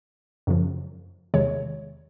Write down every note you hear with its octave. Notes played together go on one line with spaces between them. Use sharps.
F#2 C#3 F3
E2 C3 D#3 G#3 C#5